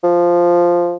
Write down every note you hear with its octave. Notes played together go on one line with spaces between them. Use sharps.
F3